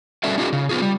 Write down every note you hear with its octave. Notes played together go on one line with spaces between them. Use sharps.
G3 C#4 F#4 A4 D5 E5
C#4 D#4 F4 G4 A4
C#3
B3 C#4 F4 G#4
G3